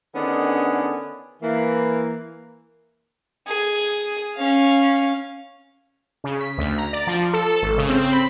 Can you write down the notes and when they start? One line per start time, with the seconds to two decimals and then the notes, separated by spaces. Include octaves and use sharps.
0.15 D3 D#3 B3 C#4 D4 G#4
1.43 E3 A#3
3.47 G#4
4.35 C#4 F5
6.24 C#3
6.41 B6
6.58 D2
6.78 A#5
6.93 D5
7.07 F3
7.33 A4
7.62 G#1
7.78 C#3
7.90 C4
8.13 B5